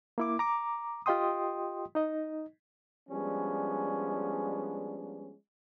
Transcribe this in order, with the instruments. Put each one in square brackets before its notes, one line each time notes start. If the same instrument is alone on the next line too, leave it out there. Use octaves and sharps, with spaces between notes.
[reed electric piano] A#3 E4 D6
A#5 D6
F4 G4 D#5 G5 C6 D#6
D#4 D#5
[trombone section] F3 G3 G#3 B3 C#4 D4